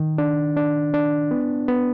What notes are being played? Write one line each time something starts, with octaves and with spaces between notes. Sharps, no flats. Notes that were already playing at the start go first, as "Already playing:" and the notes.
Already playing: D#3
D4
D4
D4
B3
B3